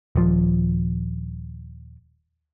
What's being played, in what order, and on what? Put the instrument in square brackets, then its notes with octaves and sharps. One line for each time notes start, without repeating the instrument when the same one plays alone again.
[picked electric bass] D#1 F3